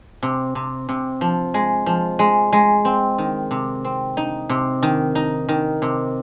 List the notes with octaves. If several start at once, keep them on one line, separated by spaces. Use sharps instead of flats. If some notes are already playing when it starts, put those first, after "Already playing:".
C3
C3
C3
F3
G#3
F3
G#3
G#3
C4
D#3
C3
C4
D#4
C3
D#3
D#4
D#3
C3